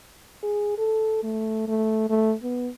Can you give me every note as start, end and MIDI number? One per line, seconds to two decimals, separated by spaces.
0.43 0.75 68
0.78 1.20 69
1.23 1.64 57
1.68 2.09 57
2.10 2.34 57
2.43 2.69 59